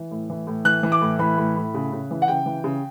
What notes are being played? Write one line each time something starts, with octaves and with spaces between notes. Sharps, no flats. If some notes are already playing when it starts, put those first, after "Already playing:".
Already playing: E3
A2
E3
A2
E3 F#6
E3
D6
A2
E3 B5
A2
A2
C#3
C#3
E3
F#5
C#3 G5
E3
C#3